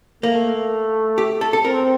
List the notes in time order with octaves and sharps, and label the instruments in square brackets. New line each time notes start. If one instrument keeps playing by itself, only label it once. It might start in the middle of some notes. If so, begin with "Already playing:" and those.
[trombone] A3 [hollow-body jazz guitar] A#3
[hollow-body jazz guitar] G4
A4
A4
[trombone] C4 [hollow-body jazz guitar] A#4